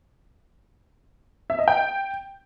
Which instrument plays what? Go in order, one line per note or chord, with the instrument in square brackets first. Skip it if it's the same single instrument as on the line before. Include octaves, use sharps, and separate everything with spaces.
[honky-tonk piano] E5
D#5
G5